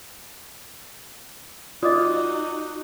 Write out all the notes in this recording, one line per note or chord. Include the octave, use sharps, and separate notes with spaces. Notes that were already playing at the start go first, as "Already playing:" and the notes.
D#4 F4 F#4 D5 D#5 D6 D#6